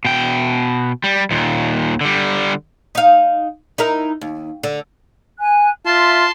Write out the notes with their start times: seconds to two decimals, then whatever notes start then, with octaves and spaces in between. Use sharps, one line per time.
0.05 B2 G5
1.04 G3
1.31 D#2 A#2
2.01 D3 G3
2.95 D#4 F5
3.78 D#4 E4 A#4
4.21 D#2
4.63 D3
5.39 G#5 F#6
5.86 F4 E5 A5 C6